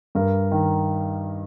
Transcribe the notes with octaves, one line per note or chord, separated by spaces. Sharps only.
G2 A#4
D#3